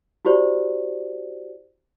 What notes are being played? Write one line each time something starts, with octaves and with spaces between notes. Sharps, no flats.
E4 F#4 G4 C5 D5